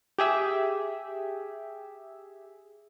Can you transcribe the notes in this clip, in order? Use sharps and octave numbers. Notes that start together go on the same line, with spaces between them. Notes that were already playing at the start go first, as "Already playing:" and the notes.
G4 G#4 E5